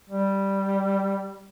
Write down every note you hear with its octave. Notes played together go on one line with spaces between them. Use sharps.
G3